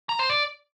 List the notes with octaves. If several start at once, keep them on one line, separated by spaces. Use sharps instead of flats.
A#5
C5
D5